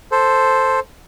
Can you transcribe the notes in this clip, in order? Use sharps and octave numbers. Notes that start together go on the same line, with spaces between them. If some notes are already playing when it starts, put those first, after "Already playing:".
A4 C5